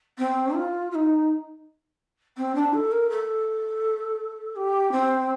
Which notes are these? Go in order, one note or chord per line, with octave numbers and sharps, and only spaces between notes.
C4
F4
F4
D#4
C4
D4
A4
A#4
A4
G4
C4